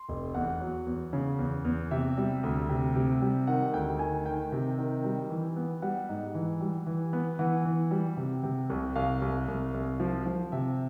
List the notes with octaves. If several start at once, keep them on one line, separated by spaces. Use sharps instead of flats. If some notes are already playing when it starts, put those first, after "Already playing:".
Already playing: C6
F1
E2 F#5
F#3
E2
C#3
E2
E2
C3 E5
G3
D2
C3
C3
G3
D#3 F#5
D2 G5
D#3 G#5
D#3 G5
C3
D#3
G3
E3
B3
G3 F#5
G#2
E3
G3
E3
B3
E3 F#5
E3
G3
C3
C3
C2
C2 F5
C2
C2
C2
F3
F3
C3 E5